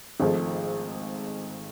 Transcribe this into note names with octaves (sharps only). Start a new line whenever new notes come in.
G#1 G#2 F3 A3